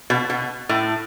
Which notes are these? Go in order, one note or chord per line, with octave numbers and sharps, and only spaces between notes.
B2
B2
A2